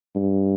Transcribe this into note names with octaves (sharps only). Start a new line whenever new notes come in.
G2